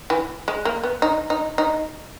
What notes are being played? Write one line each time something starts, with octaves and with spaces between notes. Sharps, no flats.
E3
G#3
A#3
B3
D#4
D#4
D#4